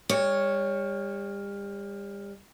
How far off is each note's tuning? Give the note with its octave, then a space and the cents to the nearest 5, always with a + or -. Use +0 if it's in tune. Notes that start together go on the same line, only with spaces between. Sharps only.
G3 +40 C#5 +0